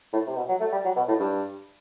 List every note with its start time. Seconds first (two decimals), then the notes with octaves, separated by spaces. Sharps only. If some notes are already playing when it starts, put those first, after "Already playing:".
0.13 A2
0.27 C3
0.36 B2
0.48 F#3
0.60 A3
0.72 G3
0.84 F#3
0.96 B2
1.08 A2
1.19 G2